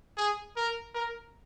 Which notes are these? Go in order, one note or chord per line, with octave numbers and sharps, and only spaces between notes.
G#4
A#4
A#4